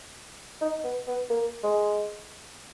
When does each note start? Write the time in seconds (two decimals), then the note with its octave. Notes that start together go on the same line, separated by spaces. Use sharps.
0.61 D#4
0.84 B3
1.08 B3
1.30 A#3
1.63 G#3